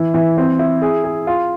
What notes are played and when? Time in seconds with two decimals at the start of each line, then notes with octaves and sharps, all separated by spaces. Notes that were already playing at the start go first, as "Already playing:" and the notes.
Already playing: E3 E4
0.14 E3
0.38 C4
0.59 E4
0.82 G#4
1.04 G#4
1.27 F4